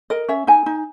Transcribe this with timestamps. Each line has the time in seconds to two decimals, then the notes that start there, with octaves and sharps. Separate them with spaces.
0.10 A#4 D#5
0.28 C#4 E5
0.47 D#4 G#5
0.66 D#4